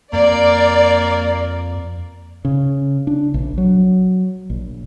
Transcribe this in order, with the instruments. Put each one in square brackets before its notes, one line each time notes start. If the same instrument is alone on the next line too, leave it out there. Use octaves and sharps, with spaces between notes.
[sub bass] F2 [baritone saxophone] A#3 [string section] D5
[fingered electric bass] C#3
D4
A#1
F#3
A#1